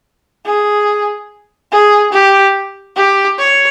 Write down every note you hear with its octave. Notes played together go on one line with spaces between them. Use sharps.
G#4
G#4
G4
G4
C#5